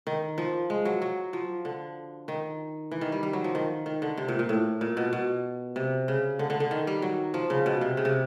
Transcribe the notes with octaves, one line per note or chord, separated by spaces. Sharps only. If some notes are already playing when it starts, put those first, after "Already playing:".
D#3
F3
G#3
F#3
F#3
F3
D3
D#3
E3
D#3
G3
G3
F#3
F3
D#3
D#3
D3
C3
A#2
A#2
A2
A#2
B2
B2
C3
C#3
D3
D3
D3
D#3
G3
F#3
F3
C#3
B2
C3
C#3
C3